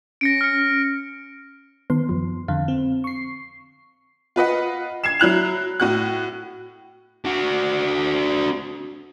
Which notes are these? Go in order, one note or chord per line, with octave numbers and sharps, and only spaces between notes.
C#4 A#6 C#7 D7
F6 C#7
D#3 B3 C6
F#2 F3
F2 D3 F5
C4
C#6 C7
F4 B4 D#5 F#5
G#6 C7 E7
F#3 E4 F#6 F7
A2 F#4 F#6
D4 F#4